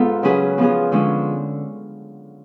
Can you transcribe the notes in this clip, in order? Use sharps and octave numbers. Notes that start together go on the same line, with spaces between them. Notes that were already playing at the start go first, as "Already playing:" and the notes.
Already playing: G#2 B3 F4 A4
C#3 F#3 C#4 G#4 B4
F3 B3 F4 G#4
D3 F3 G#3 C#4